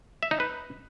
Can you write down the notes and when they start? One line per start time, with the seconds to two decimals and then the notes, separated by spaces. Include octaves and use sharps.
0.23 E5
0.31 D#4
0.40 B4